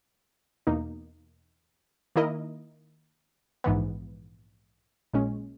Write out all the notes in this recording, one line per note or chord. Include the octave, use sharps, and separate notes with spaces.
E2 B2 A#3 D#4
D#3 A#3 E4 A#4 D#5
A#1 G#2 E3 B3
A#1 A#2 G#3 C#4